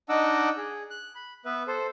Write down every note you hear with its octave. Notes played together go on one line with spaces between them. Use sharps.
D4 D#4 D#5 F#5 D6 E6
G#4
F#6
B5
B3 B4 E5
A4 C5